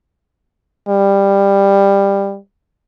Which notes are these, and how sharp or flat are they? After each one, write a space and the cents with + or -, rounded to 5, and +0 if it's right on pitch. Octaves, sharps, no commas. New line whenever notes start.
G3 +15